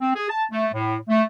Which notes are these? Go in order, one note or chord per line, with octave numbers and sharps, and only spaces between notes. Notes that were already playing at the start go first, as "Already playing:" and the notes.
C4
G#4
A5
A3
A2
A3